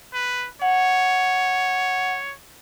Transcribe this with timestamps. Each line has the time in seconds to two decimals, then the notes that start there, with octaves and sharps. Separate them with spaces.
0.14 B4
0.62 C#5 F#5